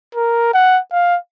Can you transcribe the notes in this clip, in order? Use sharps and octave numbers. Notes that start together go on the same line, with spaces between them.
A#4
F#5
F5